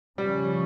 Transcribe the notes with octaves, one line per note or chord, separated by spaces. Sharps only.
C#3 F3 G3 C#4